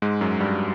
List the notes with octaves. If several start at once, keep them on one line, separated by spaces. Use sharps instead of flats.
G#2 G#3
F#2 F#3
G2 G3